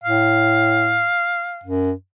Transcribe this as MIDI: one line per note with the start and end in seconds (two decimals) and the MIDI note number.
0.04 1.08 45
0.04 1.71 77
1.64 1.93 42